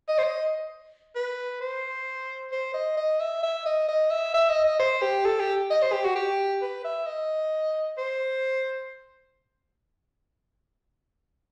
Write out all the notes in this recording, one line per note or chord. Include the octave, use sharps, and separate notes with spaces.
D#5
C5
D#5
B4
C5
C5
D#5
D#5
E5
E5
D#5
D#5
E5
E5
D#5
D#5
C5
G4
A4
G4
D#5
C5
G4
F#4
G4
B4
E5
D#5
C5